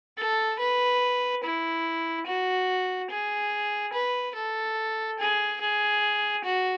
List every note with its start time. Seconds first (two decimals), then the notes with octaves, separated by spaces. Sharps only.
0.18 A4
0.59 B4
1.44 E4
2.27 F#4
3.10 G#4
3.94 B4
4.35 A4
5.19 G#4
5.61 G#4
6.44 F#4